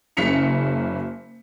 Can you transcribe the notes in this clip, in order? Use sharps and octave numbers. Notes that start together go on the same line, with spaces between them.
F#1 C#3 F#3 B6 C#7 F7